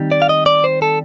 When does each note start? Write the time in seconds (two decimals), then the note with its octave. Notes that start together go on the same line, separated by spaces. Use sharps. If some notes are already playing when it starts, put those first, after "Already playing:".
Already playing: D#3 G3 C4 D#4
0.12 D5
0.22 F5
0.29 D#5
0.46 D5
0.64 C5
0.82 A4